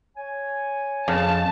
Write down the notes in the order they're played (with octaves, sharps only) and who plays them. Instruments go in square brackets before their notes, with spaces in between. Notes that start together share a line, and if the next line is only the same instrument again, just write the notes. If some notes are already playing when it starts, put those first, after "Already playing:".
[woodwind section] C#5 G#5
[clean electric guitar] F2 [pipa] C#3 [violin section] A5